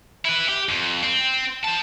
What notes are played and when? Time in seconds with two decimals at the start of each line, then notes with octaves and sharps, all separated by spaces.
0.25 E4 B4
0.48 G4
0.69 F2
1.03 C4
1.64 C5 A5